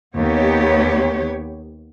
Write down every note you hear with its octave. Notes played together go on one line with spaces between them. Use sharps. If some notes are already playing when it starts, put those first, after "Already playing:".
D#2 B3 G4 C#5